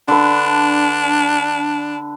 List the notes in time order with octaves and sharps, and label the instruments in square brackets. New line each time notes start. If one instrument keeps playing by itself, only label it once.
[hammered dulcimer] D3 B4 [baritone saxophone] D4